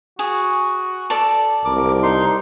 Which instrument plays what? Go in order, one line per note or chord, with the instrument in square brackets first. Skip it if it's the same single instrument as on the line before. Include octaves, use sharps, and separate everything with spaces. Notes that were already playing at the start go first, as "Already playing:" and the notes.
[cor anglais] F#4 [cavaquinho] G#4
[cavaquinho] A4 D5 A5
[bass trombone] C2 [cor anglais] A#4 [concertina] D6
[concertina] D#4 C6